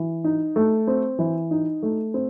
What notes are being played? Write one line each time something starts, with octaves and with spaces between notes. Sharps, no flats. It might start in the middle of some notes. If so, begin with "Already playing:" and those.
Already playing: E3
D#4
A3
C4
E3
D#4
A3
C4